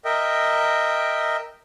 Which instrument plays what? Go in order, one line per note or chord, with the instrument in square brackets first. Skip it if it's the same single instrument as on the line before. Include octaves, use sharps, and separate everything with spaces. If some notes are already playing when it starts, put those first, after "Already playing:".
[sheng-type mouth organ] A#4 D#5 E5 G5